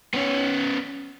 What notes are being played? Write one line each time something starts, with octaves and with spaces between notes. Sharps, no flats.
B3 C#4